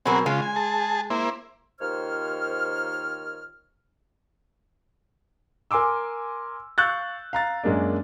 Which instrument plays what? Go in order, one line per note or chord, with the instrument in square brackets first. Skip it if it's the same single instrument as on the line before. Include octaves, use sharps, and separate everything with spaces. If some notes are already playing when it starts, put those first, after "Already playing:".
[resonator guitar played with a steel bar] B2 F#3 A#4 [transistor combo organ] C4 F#4 G#4
[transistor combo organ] C#3 F4 [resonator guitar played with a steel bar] G#3
[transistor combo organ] G#5
G#4 A5
A#3 E4 C5
[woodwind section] D#2 D#3 F3 C5 C#5 F6
[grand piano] A#4 G#5 C6 D6 E6
F5 C#6 E6 F#6 G6 A6
F5 A#5 A6
F#2 G#3 A#3 D4